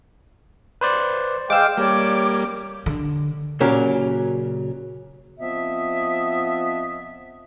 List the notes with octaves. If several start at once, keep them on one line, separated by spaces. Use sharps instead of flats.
B4 C5 D5
G#3 F5 G5 D6 E6
G3 A#3 C#5 D5 D6
D3
A#2 C#3 F#3 C#4 G4 A#4
F3 B3 C4 D#5 E5